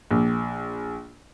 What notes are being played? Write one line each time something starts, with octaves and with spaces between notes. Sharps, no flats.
A#1